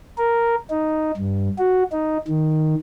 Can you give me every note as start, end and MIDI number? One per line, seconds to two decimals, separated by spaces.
0.18 0.56 70
0.70 1.12 63
1.17 1.49 43
1.58 1.83 66
1.92 2.18 63
2.28 2.75 51